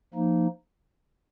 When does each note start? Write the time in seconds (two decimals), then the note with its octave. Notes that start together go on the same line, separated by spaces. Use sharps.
0.14 F3 A#3 D#4